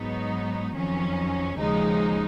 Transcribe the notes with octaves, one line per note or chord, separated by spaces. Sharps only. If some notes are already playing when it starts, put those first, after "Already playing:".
Already playing: G#2 F#3 B3 D#4
F2 D#3 F#3 C#4
D#2 C#3 F3 G#3 D#4